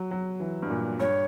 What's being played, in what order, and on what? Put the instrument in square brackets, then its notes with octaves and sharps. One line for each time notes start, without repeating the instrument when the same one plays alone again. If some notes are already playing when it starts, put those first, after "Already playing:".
Already playing: [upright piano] F#3
F#3
E3
G2
A#2
[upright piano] G2 [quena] C#5